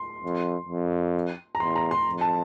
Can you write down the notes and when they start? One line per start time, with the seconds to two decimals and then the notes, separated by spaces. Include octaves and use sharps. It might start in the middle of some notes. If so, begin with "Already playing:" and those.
Already playing: C6
0.24 F2
0.68 F2
1.55 A#5
1.60 E2 C6
1.76 A#5
1.91 C6
2.07 F2
2.21 A5